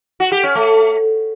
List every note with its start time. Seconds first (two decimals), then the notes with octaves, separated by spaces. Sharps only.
0.20 F#4
0.32 G4
0.43 C#4
0.55 A3